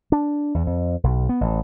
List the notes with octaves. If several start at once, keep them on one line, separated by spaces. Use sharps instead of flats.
D4
E2
F2
B1
B3
A1